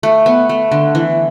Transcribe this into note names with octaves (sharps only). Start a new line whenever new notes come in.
A3
B3
A3
D3
E3